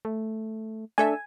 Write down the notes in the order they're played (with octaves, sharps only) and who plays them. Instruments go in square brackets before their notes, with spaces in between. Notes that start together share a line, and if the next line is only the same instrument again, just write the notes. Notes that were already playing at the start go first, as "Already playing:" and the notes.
[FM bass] A3
[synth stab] A3 A4 E5 [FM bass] D4 [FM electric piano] G#5